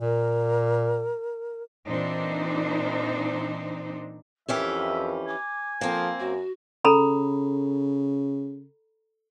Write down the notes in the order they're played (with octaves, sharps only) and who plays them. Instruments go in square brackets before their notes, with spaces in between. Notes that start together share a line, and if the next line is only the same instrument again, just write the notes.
[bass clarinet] A#2 [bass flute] A#4
[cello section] A#2 E3 C4 D4 D#4 C5
[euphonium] F2 [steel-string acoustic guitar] E3 C#4 G4 [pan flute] A#4 [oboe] E5
[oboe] G#5 [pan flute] D6
[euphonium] F3 [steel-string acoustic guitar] A#3 C4 [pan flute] A4
[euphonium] F#2 [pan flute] F#4
[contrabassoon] C#3 [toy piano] A4 A#5 B5